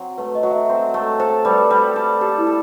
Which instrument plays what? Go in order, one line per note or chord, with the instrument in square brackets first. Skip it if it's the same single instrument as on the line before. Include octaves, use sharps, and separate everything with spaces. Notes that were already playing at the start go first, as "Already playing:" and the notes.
Already playing: [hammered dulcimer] F#3 C4
[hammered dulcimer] A3 [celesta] B4
[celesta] D#5
[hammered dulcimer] F#3
[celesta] E5
[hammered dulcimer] C4
A3
[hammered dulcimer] A4 [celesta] C5
[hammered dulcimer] G3 [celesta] B4
[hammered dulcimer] G3
A4
[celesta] G4 [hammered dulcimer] A4
[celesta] E4
[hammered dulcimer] A4